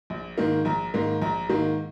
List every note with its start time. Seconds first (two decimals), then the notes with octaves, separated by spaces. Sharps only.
0.10 A#1
0.38 G#2 D#3 A#3
0.65 A#1 A#5
0.94 G#2 D#3 A#3
1.22 A#1 A#5
1.49 G#2 D#3 A#3